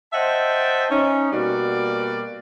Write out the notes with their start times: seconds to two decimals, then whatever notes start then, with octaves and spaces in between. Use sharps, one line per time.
0.13 C5 D#5 E5 F#5 G5 A5
0.90 C#4 D#4
1.32 B2 G3 A#3 F#4 D5